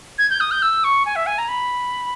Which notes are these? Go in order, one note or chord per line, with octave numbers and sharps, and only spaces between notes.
G#6
G6
D#6
G6
E6
C#6
G#5
E5
G#5
A#5
B5